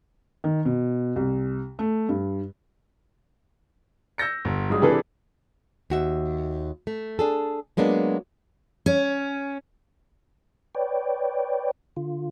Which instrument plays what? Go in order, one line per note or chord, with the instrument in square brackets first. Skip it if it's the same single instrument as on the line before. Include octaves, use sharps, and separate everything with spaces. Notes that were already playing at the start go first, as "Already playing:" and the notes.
[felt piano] D#3
B2
C2
A3
G2
[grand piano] E6 G6 A#6 C#7
G1
G2 F#3 G#3 D#6
C3 E3 D4 G#4 A4 B4
[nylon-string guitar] D#2 F#4 E5
A3
D4 G#4 A4
F#3 G#3 A#3 B3 D4
[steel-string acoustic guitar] C#4
[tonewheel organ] B4 C#5 D5 G5
D3 F4